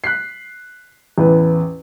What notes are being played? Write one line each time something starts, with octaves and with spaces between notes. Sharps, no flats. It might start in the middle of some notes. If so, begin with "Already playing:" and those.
F#6 B6 C7
A1 E2 B4